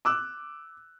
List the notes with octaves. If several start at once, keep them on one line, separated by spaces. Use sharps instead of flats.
D6 E6 F#6